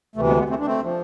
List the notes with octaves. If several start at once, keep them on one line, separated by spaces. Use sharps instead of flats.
D2 C3 E3 A3
G#3 B3
G#3 B3
A3 C4
D4
A3 C4
F3